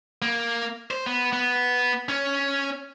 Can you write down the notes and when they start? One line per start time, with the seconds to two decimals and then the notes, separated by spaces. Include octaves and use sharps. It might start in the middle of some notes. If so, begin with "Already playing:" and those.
0.22 A#3
0.91 C5
1.07 B3
1.33 B3
2.09 C#4